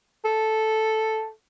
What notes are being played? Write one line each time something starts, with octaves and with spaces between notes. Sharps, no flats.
A4